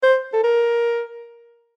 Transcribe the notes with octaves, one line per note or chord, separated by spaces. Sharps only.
C5
A4
A#4